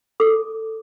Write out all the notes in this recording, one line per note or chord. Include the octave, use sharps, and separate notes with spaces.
A4 D6